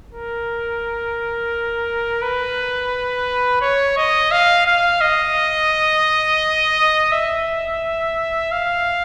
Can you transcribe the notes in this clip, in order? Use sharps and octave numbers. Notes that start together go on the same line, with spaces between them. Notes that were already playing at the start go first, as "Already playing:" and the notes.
A#4
B4
C#5
D#5
F5
F5
D#5
E5
F5